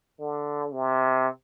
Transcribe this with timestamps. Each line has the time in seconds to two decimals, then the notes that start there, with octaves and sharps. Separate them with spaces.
0.20 D3
0.72 C3